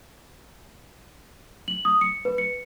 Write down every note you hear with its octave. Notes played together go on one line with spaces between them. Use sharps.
F#7
D#6
C#7
B4
C#7